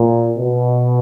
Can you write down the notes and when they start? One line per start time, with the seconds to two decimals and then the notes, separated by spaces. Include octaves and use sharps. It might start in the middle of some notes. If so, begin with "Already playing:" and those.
Already playing: A#2
0.39 B2